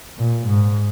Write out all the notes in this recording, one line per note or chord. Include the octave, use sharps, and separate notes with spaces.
A#2
G#2